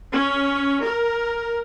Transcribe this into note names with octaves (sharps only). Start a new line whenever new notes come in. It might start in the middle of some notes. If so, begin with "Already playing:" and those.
C#4
A#4